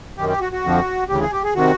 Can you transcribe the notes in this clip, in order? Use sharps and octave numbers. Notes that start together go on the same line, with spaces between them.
F#2 D#3 G4
G4
F#4
F#4
F2 D3 F3
D2 C#3 E3 G4
G#4
G4
G#4
C3 D#3 F#4